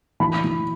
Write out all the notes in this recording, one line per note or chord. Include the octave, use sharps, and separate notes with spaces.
E3 B5
E3